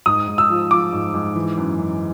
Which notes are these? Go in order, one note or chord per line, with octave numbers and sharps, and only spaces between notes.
G#2 D#6
G#2
E6
F3
F3 D6
G#2
G#2
E3
F#2
F#2